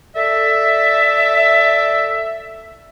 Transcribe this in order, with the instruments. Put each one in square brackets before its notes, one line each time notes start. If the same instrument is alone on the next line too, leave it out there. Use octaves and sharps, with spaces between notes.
[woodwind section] A4 D5 E5